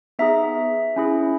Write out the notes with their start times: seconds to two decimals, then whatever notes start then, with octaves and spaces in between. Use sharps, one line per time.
0.19 B3 D#4 G#4 E5
0.96 C#4 E4 G#4